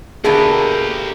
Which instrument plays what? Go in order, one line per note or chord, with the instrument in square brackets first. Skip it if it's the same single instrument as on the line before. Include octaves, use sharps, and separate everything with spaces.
[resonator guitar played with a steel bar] B2 D3 A3 [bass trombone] A#3 [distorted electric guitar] G4 A#4 [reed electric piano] G#4